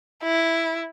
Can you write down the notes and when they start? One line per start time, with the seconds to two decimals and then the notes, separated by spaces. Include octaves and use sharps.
0.23 E4